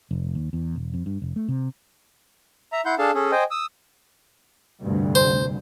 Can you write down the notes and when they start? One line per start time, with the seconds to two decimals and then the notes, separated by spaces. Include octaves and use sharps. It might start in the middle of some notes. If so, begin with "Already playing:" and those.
0.11 F1
0.35 D#2
0.53 E2
0.76 E1
0.94 F2
1.06 G2
1.22 F1
1.36 A3
1.48 C3
2.72 E5 A#5
2.86 E4 F#5 C6 G6
2.98 D4 G#4 A4 F5 A5
3.14 C#4 G#4 A4
3.32 C5 D#5 G5 G#5
3.51 D#6 E6
4.81 F1 D2 G2
5.15 C5